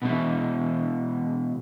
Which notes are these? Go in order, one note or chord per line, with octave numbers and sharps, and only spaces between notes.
B2 E3 G#3 E4